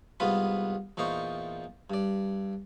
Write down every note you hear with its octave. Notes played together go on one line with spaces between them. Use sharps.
C2 G#2 B3 F4 B4
E2 A#2 D#4 C5 C#6
G2 D5